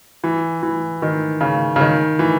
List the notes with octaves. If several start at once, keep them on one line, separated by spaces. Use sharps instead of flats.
E3
E3
D#3
C#3
C#3
D#3
E3